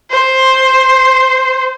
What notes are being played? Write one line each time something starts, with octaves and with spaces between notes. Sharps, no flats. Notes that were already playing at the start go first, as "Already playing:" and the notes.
C5